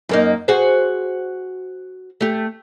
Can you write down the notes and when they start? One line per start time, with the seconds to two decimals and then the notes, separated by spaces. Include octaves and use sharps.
0.09 F#2 A#3 D#4
0.48 F#4 G#4 C5
2.21 A3 G4